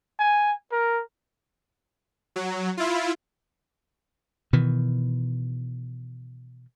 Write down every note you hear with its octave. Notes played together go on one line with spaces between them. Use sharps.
G#5
A#4
F#3
E4 F4
B2 D#3 E3